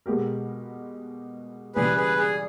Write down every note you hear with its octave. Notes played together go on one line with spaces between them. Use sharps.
B2 G#3 B3 G4 A#4
C#3 E3 G3 G#4 B4
G#4 B4
G#4